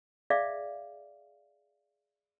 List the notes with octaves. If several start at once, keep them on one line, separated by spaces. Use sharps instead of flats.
G#4 D5 E5 F5